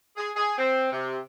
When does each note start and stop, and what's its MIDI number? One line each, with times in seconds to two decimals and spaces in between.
0.16 0.30 68
0.35 0.57 68
0.58 0.92 60
0.92 1.18 48